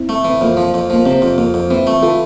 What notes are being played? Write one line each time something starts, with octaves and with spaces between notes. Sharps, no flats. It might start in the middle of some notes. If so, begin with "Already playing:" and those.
Already playing: C4 E4
A3
E3
C4
F2 A#3
F3
F2
F3 A#3
C3 C4
F2
F2 A#3
F2
E3 C4
A3
E3 F4 A4